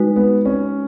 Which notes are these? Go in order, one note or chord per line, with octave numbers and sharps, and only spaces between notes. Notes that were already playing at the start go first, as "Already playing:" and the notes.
Already playing: G#3 D#4 F#4 B4
B3
C#4